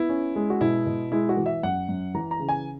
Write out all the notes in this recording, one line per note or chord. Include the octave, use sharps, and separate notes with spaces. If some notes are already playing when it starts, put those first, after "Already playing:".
Already playing: B3 E4
C#4
G#3
F#4
B2 E4
B2
G#3 E4
F#4
E3
E5
F#2 F#5
F#2
E3 A#5
A#5
C#3
G#5